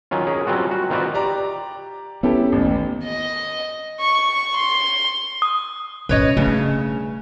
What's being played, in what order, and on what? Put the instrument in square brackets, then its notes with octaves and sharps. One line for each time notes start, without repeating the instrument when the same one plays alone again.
[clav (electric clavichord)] D#3 F#3 C#4 F4
C#4 G#4 A#4
F#3 G3 C4 F4 F#4
F#4
D#3 C4 F4 F#4 B4 D5
[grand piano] G4 D5 A#5
[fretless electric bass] B3 C#4 [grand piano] E4 G4 A4
[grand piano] A1 D#2
[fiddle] D#5
C#6
C6
[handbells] D#6
[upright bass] B2 C#4 [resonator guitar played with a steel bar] B4 C#5 D#5
[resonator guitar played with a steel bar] G2 C#3 [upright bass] A3